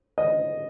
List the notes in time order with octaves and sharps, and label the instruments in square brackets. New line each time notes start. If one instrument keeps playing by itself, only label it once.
[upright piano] D#5